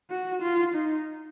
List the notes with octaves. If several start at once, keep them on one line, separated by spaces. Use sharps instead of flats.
F#4
F4
D#4